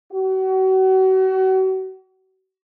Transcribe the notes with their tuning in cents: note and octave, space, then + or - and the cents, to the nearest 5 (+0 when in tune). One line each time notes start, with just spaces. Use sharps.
F#4 +35